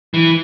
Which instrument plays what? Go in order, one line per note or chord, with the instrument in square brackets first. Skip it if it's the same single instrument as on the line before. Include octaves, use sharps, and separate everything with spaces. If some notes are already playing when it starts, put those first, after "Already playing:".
[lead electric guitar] E3